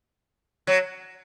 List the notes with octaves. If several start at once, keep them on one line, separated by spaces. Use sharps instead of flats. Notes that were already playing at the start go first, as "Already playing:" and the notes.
F#3